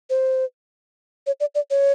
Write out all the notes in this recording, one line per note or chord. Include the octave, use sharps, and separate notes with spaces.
C5
C#5
D5
D5
C#5